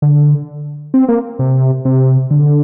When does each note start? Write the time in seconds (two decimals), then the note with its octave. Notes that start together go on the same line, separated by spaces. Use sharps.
0.02 D3
0.94 C4
1.08 A#3
1.39 C3
1.85 C3
2.31 D3